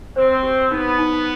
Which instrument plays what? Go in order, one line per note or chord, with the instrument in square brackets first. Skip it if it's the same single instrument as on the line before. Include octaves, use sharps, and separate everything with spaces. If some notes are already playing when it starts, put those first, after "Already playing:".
[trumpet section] C4 [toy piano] C5
[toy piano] G4
[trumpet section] B3 [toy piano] D#4
[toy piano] D#4